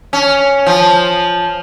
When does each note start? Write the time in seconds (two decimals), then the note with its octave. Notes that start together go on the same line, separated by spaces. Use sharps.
0.13 C#4
0.66 F3